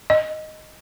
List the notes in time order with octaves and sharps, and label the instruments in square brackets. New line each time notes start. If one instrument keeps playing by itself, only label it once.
[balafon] D#5